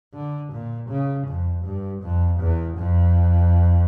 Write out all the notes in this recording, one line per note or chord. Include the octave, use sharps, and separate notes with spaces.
D3
A#2
C#3
F2
G2
F2
E2
F2